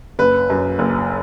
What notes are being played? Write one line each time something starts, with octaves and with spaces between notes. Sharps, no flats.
F#1 B4
F#2
F#1